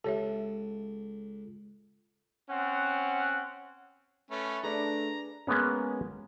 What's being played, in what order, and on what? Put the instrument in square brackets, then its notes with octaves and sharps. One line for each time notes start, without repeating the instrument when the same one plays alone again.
[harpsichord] C#2 [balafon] G4 C#5 E5 [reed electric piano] A4
[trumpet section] C4 C#4 F#5
[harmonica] A3 C#4 B4
[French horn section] A3 D4 [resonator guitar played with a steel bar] G#4 B4 D5 [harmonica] A#5
[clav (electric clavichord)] G#3 A#3 B3 C#4